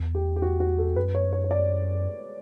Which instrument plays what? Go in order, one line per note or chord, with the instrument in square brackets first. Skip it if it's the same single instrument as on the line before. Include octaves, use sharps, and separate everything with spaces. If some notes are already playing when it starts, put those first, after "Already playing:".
Already playing: [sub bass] E2
[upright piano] G4
G4
F#4
F#4
A4
[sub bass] F#2 [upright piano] B4
[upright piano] C#5
C#5
C#5
D5